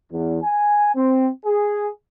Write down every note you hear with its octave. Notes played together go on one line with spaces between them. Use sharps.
E2
G#5
C4
G#4